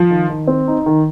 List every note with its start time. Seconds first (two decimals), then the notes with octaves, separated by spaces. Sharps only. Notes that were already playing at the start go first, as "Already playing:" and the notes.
Already playing: F3
0.10 D#3
0.29 D#3
0.47 C4
0.68 D#4
0.86 D#3